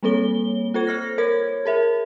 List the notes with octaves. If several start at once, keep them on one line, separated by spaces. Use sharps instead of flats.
G3 A#3 C4 A4 C#5 G7
F4 A4 C5 G#6
C5 F6 A#6
A#4 C#5 G#6
G#4 A#4 E5